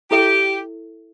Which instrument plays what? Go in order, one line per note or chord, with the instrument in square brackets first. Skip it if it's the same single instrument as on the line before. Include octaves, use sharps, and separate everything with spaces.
[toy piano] E4 A4 E5 [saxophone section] G4